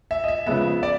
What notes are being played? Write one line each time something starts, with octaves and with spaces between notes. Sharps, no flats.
E5
D#5
E5
C#3 F3 G#3 B3 E5
D5